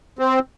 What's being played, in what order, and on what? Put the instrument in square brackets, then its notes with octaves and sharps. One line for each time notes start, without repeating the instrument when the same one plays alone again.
[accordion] C4